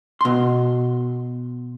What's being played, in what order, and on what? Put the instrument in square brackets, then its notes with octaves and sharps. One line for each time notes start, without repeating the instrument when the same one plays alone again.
[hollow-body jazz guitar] B2 C6